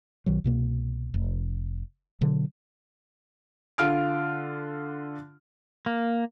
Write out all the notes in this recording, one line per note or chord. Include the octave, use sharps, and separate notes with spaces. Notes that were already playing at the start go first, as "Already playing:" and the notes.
B1 D#3 F#3
C2 B2 A#3
F1
B2 D3 F#3
D3 F4 F6 D7
A#3